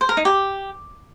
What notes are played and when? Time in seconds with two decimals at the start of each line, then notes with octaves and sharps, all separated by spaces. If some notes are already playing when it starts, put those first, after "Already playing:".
0.01 C5
0.09 A#4
0.17 D#4
0.25 G4